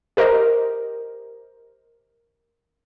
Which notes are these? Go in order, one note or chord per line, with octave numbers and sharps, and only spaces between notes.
G4 A#4 C5 D#5